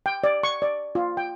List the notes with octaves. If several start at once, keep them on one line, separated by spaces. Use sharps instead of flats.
G5
D5
C#6
D5
F4
G5